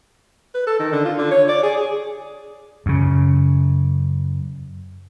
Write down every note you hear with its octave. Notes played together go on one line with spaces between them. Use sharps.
B4
A4
D#3
D3
F4
D3
C#5
D5
G#4
G#4
F#2 C#3